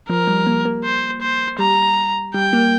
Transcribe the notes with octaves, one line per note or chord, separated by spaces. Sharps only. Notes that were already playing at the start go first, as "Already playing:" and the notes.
F3 A#4
G3
A#3
A#3
C5
C5
G3 A#5
G3 G5
A#3